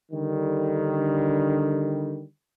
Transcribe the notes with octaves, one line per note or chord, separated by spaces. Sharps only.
D3 D#3 G3